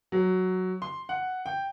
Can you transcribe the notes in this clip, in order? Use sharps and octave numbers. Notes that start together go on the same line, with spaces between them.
F#3
C6
F#5
G5